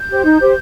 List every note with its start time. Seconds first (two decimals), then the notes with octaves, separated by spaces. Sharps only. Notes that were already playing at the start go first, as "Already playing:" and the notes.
Already playing: G6
0.09 G4 C5
0.24 D#4
0.40 G4 C5